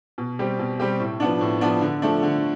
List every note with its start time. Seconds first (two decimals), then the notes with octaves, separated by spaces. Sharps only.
0.18 B2
0.39 G3 C4 G4
0.59 B2
0.80 G3 C4 G4
1.00 A2
1.20 F3 B3 D4
1.41 A2
1.61 F3 B3 D4
1.81 D3
2.02 F3 A3 D4
2.23 D3